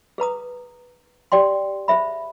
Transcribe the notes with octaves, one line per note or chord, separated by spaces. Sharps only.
G#4 B4 A#5 D#6
G4 D5 G5 C6
G#4 C5 E5 B5